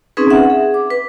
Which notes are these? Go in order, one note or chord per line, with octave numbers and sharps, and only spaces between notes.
C4 C#4 D#4 G#4 B4
E5 F#5
G#4
D6
B4